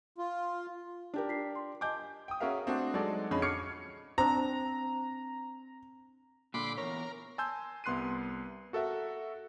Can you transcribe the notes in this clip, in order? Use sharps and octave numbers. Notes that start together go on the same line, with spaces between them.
F4
D4 G4 A#4
F4 B6 C7
C6
D#5 G#5 A5 D6 G6
G5 D#6
C#4 F#4 G#4 A#4 E5 F5
A3 C4 D4 F#4
F#3 G#3 D#4 F#4 A4 D5
F2 D3 C#4 G#4 D#5 B5
C#6 D6 F6 G#6 C7 C#7
C4 D4 A#5
A#2 D3 B5 C6 D6
E2 A#4 C#5
G#5 A5 C6 E6 G6
C2 B3 C6 F#6 C7 D#7
F#4 A4 A#4 E5 F#5